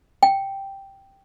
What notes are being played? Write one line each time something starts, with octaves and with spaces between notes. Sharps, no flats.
G5